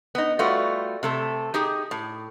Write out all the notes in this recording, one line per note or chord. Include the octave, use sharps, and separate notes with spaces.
B3 D#4
G3 A3 F4 F#4 B4
C3 A3 A4
D#4 G4 G#4
A2